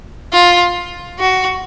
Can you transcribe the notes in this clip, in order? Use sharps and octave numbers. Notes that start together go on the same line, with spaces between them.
F4
F#4